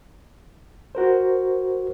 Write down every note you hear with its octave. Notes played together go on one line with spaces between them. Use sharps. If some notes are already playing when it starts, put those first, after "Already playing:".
F#4 A#4 C5